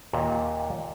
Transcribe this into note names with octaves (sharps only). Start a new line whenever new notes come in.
D#2 A#2